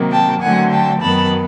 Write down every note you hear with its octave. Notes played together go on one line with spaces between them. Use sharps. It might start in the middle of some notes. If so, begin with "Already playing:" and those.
Already playing: C3 D#3 F#3 A#3
G5 A5
D3 F#3 A3 C4 F#5 G#5
G5 A5
F#2 D#3 F#3 B3 A5 B5